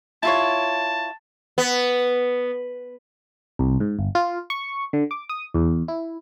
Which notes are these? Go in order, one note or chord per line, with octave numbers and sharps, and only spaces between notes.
E4 F4 C#5 A5
B3
C2
G#2
G1
F4
C#6
D3
D6
D#6
E2
E4